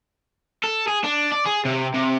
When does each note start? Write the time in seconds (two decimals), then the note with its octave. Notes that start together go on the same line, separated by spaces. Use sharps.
0.64 A4
0.88 G#4
1.04 D4
1.32 D5
1.46 G#4
1.65 C3
1.94 C3